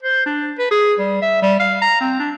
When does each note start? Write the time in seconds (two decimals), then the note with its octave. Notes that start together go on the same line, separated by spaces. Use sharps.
0.03 C5
0.26 D4
0.58 B4
0.71 G#4
0.99 G3
1.22 E5
1.42 G3
1.59 F5
1.82 A#5
2.01 C4
2.19 D4